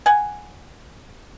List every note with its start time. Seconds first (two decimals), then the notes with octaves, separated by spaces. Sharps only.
0.06 F#5 G#5